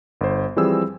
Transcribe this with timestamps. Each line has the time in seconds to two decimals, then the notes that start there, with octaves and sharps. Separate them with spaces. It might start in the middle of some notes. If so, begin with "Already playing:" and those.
0.21 G1 C5
0.56 E3 F3 G3 C4 G#4 E6